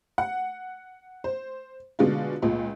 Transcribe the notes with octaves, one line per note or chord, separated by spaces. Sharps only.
F#5
C5
B2 D3 G#3 F4
C#2 A#2